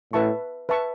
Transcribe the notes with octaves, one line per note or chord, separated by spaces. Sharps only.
A2 B4 E5 A5 C#6
B4 E5 A5 C#6